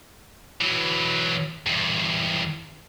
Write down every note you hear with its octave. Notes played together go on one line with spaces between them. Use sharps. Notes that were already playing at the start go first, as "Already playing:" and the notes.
E3 F#3
E2 G2